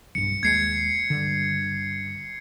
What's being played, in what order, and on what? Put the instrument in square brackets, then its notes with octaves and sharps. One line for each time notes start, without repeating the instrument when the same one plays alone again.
[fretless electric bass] B1 G2 [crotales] C#7
[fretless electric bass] D#2 G#3 [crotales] G#6 C7 C#7
[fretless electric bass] G2 D3